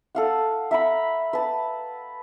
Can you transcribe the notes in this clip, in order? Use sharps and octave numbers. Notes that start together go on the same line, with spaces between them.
A4 F5 F#5
E5 A#5 B5
B4 A5